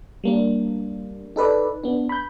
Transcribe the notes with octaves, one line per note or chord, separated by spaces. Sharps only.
G3 A#3 D4
D#4 A4 B4 D5
B3 D4
B5 G6